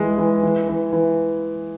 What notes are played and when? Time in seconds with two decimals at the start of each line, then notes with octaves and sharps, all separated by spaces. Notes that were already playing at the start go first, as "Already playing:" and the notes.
Already playing: E3 G#3
0.18 E3
0.43 E3
0.68 E3
0.92 E3